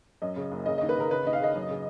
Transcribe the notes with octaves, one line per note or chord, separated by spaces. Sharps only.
F#2 D#5
C#3
F#1
C#3 D#5
D#2 D#5
B4
C#3 A#4
C#3 B4
D#2 D#5
F5
C#3 D#5
F#2
C#3